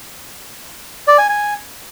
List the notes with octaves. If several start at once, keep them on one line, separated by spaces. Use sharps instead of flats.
D5
G#5
G#5